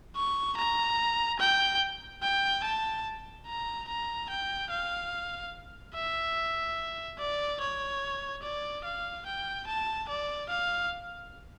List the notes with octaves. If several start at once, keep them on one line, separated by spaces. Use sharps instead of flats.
C#6
A#5
G5
G5
A5
A#5
A#5
G5
F5
E5
D5
C#5
D5
F5
G5
A5
D5
F5